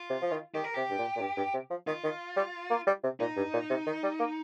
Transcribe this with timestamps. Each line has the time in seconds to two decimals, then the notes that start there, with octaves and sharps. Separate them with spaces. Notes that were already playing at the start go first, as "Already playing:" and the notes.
Already playing: F4
0.10 C3
0.22 F3
0.31 D#3
0.54 D#3 G4
0.64 A#4
0.74 C3 G4
0.91 G2
0.99 A#2
1.16 A#2
1.21 G2
1.37 G2
1.54 C3
1.70 F3
1.87 D#3 F4
2.04 D#3
2.37 G3
2.70 A#3
2.87 G3
3.04 C3
3.20 A#2 D#4
3.37 G2
3.53 A#2
3.70 C3
3.86 D#3
4.03 G3
4.19 A#3